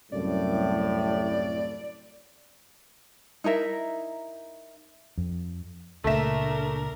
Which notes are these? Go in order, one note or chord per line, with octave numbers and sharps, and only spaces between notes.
C2 F#2 A2 D5
D#4 E4 A#4 E5
F2
C#2 A#2 A3 D4 A#4 E5